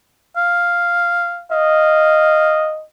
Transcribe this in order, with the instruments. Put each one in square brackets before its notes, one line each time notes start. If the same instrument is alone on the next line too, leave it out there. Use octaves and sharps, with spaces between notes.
[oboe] F5
[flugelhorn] D#5 [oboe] F5